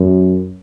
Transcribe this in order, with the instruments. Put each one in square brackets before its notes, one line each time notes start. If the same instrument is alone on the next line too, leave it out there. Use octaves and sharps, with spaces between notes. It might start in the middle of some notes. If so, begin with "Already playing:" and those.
Already playing: [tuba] F#2